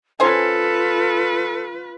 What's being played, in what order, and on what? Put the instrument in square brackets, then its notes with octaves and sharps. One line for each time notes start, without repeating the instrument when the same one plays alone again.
[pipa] C#4 C5 G#5 [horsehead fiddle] F4 B4 [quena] A4